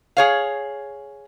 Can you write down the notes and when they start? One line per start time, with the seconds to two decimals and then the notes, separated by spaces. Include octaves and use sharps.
0.17 G#4 C#5 F5